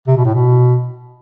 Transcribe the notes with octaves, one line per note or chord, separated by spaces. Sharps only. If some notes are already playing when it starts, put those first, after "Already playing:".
C3
B2
A2
B2